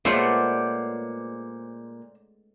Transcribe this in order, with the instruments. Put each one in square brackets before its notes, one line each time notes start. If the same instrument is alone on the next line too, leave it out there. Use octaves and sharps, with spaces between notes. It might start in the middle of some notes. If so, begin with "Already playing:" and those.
[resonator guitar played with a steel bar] A#2 [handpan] G#3 C#4 [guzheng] A3 B3 F4 [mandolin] C5 D5